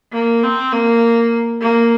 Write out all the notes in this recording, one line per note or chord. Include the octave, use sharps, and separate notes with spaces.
A#3
C4
A#3
A#3